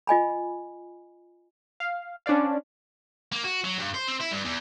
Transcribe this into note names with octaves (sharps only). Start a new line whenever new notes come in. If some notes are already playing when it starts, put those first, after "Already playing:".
F4 D#5 G#5 B5
F5
C#4 D4 C5 D5 F5
A#3
F#4
F#3
G2
C5
C4
E4
G2
E2